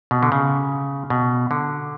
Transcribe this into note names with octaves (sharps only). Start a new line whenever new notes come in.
B2
D3
C#3
B2
D3